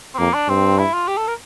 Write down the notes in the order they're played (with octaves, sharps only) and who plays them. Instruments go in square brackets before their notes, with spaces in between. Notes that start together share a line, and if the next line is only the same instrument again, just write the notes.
[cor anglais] C4
[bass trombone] F2 [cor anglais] A#3
[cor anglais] D4
[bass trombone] G2 [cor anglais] C4
[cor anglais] E4
F4
G4
A4
A#4